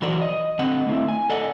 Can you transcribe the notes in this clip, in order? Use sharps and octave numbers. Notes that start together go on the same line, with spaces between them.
E3 F#3 F#4 A#4 C5 D5
D#5
D3 C4 D#5 F#5
A3 C4 C#4 E4
G#5
A4 D5 D#5 F#5